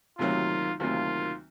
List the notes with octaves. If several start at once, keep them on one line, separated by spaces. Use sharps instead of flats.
D2 C3 D#3 F#3 A#3 F4
D2 C3 D#3 F#3 A#3 F4